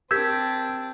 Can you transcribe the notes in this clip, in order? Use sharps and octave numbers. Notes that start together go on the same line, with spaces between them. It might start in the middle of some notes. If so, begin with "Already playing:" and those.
C4 D4 G4 A#4 E6 G6 G#6 B6